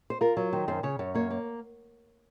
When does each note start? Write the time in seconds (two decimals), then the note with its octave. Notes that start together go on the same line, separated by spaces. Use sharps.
0.10 C5
0.21 F4 A#4
0.37 F#3
0.53 D#3 C5
0.68 F#2 C5
0.83 C#3 C#5
0.99 F#2 C#5
1.15 A#3 C#5
1.30 A#3